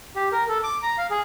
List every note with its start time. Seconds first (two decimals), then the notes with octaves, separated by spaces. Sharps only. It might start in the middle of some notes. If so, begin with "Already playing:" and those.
0.16 G4
0.32 A#4
0.48 A4
0.63 D6
0.83 A#5
0.98 F5
1.10 G#4